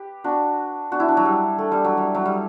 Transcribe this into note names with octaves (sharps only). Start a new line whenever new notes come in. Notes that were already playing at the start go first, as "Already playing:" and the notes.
Already playing: G4 B4
D4 F#4
D4 F#4
E4
D4
F#3
G3
A3
G3
F#3
G3
F#3
G3